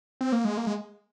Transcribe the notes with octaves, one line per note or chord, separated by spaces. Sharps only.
C4
A#3
G#3
A#3
G#3